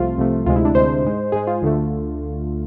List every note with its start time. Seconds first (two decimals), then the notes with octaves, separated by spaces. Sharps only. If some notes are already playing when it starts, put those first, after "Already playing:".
Already playing: C2 C3 F3 A3 F4
0.17 C2 C3 F3 A3
0.46 D2 C3 G#3 F4
0.56 E4
0.65 D4
0.75 D2 C3 G#3 C5
1.05 G#2 G#3
1.32 G#2 G#3 G#4
1.47 F4
1.62 D2 D3 A3